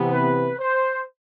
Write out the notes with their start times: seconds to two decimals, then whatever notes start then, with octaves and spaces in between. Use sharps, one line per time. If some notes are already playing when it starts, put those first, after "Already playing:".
Already playing: C3 E3 B3
0.13 B4
0.59 C5